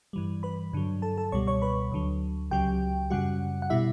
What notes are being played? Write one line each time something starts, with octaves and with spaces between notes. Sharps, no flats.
G2 E3 G3
B4 B5
G2 D3 F#3
A4 A5
A4 A5
C#2 B2 G3 C#5 C#6
C#5 C#6
B4 B5
D2 D3 F#3
C#2 C#3 F#3 G4 G5
F#2 C#3 G3 F#4 F#5
F#5
B2 G3 E4 E5